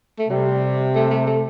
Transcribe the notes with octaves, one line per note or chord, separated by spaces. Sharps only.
A3
C3 G3
A3
A3
A3